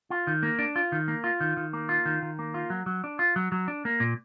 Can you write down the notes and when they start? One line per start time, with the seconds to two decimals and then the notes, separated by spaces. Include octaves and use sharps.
0.10 F4
0.27 D#3
0.43 A#3
0.59 D4
0.76 F4
0.92 D#3
1.08 A#3
1.24 F4
1.41 D#3
1.57 D#3
1.73 A#3
1.89 F4
2.06 D#3
2.22 D#3
2.39 A#3
2.54 F4
2.70 F#3
2.86 F#3
3.04 D4
3.19 F4
3.36 F#3
3.52 F#3
3.68 D4
3.85 A#3
4.00 A#2